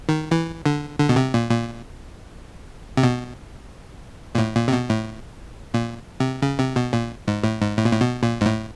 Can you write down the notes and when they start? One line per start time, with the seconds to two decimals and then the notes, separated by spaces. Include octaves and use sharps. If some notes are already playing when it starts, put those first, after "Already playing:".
0.09 D#3
0.31 E3
0.66 D3
0.99 D3
1.09 B2
1.16 C3
1.34 A#2
1.50 A#2
2.97 C3
3.03 B2
4.35 A#2
4.38 A2
4.56 A#2
4.68 C3
4.72 B2
4.89 A2
5.74 A#2
6.20 C3
6.42 C#3
6.59 C3
6.76 B2
6.93 A#2
7.28 G#2
7.44 A2
7.61 G#2
7.78 A2
7.85 A#2
7.92 A2
8.01 B2
8.23 A#2
8.41 G#2
8.46 A2